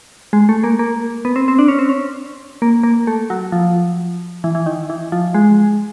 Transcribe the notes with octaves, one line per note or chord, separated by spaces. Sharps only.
G#3
A3
A#3
A#3
B3
C4
C4
D4
C#4
C4
C#4
A#3
A#3
A3
F#3
F3
E3
E3
D#3
E3
F3
G#3